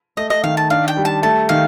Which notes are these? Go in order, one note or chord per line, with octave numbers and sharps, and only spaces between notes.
A3 D#5
D#5
D#3 F5
A5
D4 F5
G5
G3
A5
A3 A5
D#3 F5